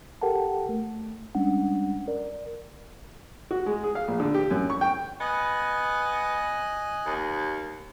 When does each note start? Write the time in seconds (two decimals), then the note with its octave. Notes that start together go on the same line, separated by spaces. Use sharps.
0.21 G4 A4 A#4 F#5 G5 A5
0.69 A3
1.35 G3 G#3 C#4 D4 F#5
2.08 A#4 D5
3.51 F#4
3.66 G#3
3.83 G#4
3.95 F5
4.08 A#1
4.20 D3
4.34 G4
4.51 F#2
4.70 C#6
4.81 G5
5.20 B3 D#5 G#5 F#6
7.06 D#2